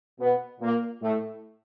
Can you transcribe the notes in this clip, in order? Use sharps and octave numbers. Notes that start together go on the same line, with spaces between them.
B2 B3
A#2 A#3
A2 A3